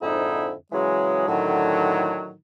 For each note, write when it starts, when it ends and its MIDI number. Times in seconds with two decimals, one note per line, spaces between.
0.01 0.53 41
0.01 0.53 44
0.01 0.53 50
0.01 0.53 63
0.01 0.53 64
0.72 1.25 49
0.72 1.25 52
0.72 1.25 54
0.72 1.25 56
1.28 2.33 45
1.28 2.33 50
1.28 2.33 51
1.28 2.33 54